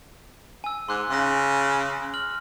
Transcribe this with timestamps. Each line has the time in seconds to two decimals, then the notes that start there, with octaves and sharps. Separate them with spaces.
0.64 G#5 E6
0.89 G#2 C6 D6 F#6
1.10 C#3 C6 A#6
2.14 F6 F#7